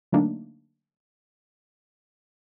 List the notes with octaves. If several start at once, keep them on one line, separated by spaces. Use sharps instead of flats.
D3 F#3 A3 A#3 D4 D#4